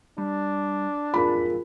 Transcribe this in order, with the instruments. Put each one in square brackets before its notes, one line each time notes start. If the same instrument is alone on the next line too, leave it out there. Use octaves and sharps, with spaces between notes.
[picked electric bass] G3 [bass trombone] D4
[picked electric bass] E1 F2 G#2 [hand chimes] F4 G#4 A#4 [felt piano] B5